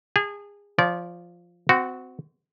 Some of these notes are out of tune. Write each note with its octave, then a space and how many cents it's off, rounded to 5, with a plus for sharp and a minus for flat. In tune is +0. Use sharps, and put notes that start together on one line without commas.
G#4 -30 A5 -5
F3 +0 D5 -30
C4 -25 F#4 +0